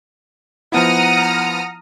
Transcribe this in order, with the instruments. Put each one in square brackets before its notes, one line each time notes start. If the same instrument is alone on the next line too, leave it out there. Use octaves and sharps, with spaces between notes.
[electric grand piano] F3 B3 E4 [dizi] F#5 [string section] A#5 D#6 F6